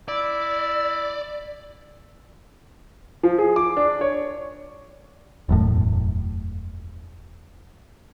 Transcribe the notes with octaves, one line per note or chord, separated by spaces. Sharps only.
E4 D5
F3
G#4
D6
D4
C#5
E1 F#2 A2